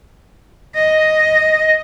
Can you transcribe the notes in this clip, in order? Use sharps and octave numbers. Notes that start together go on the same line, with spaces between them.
D#5